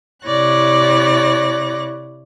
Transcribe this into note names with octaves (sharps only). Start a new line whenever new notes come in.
C3 E4 C#5 D5 F#6 A#6